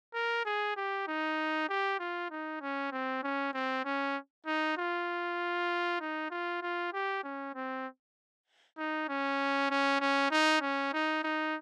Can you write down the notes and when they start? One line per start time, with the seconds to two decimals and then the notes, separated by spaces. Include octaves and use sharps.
0.14 A#4
0.45 G#4
0.77 G4
1.07 D#4
1.69 G4
1.99 F4
2.31 D#4
2.61 C#4
2.91 C4
3.23 C#4
3.54 C4
3.85 C#4
4.46 D#4
4.77 F4
6.00 D#4
6.30 F4
6.62 F4
6.93 G4
7.24 C#4
7.55 C4
8.78 D#4
9.09 C#4
9.70 C#4
10.00 C#4
10.31 D#4
10.62 C#4
10.93 D#4
11.23 D#4